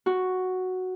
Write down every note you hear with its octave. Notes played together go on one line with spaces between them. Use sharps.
F#4